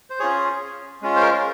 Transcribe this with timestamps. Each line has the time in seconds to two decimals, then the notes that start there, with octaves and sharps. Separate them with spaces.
0.10 C5
0.19 C#4 F4 G#4 C#5
1.02 G#3 C#4 F4
1.16 C5
1.22 A#4